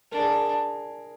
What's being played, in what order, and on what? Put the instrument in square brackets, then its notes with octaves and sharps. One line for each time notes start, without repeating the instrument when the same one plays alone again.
[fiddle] D4 [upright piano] A#4
[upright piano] G#4
A#4